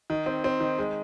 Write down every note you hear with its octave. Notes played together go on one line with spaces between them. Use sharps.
D#3
C4
C4
D#3
G#3